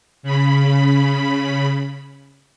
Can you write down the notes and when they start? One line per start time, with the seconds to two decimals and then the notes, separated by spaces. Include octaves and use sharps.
0.23 C#3 B5